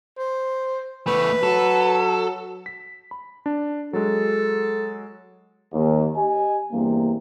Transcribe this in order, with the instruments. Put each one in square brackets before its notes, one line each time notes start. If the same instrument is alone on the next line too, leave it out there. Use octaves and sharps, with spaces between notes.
[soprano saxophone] C5
[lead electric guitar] E2 A3 [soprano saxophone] B4
[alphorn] F#3 [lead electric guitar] A4
[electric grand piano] B6
B5
D4
[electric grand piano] F#3 G#3 [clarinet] A4
[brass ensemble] D#2
G4 D#5 G#5
E2 G2 C3 A#3